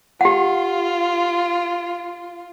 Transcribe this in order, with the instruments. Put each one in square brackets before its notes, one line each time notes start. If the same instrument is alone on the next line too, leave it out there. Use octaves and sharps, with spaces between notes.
[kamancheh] F4 [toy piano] G4 F#5